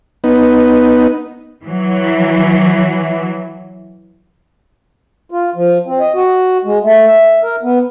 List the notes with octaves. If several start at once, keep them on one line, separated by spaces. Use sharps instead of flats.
B3 D#4
E3 F#3
F4
F3
C4
D#5
F#4
G#3
A3
E5
A#4
B3